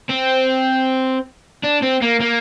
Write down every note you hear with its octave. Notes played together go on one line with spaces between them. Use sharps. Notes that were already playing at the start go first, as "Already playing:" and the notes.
C4
D4
C4
A#3
A#3